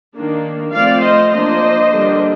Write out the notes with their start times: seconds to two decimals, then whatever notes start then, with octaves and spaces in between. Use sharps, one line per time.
0.15 D#3 A#3 D4
0.74 F3 A3 C4 D5 F5
1.03 C5 D#5
1.33 F3 A#3 D4 C5 D#5
1.93 D3 G3 A#3 D4